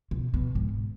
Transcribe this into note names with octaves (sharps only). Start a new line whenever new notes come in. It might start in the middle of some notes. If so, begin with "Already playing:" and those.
B2
B2
G#2